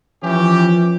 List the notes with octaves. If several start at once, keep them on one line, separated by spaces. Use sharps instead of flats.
E3 F3 C#4 G4